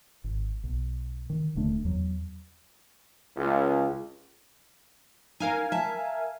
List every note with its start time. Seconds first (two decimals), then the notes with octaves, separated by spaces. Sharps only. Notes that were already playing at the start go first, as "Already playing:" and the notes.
0.24 G#1
0.64 B1
1.30 D#3
1.55 D#1 D3 A3 D4
1.84 E2 F#3
3.35 C#2
5.40 D#4 A#4 F5 G#5
5.72 E5 A5